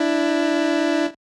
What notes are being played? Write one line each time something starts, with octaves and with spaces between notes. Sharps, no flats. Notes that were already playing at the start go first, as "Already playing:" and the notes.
Already playing: D4 E4